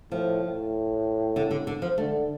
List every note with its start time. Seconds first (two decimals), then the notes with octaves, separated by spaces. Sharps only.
0.11 A2 F3
0.43 A2
1.36 D3
1.51 D3
1.67 D3
1.82 F3
1.98 D3 A3